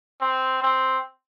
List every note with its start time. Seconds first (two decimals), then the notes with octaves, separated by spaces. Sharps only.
0.21 C4
0.63 C4